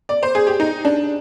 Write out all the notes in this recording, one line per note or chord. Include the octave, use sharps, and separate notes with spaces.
D5
C5
G#4
G4
D#4
D4